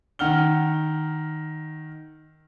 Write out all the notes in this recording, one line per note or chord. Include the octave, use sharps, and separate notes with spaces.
D#3 F#5 F6 G7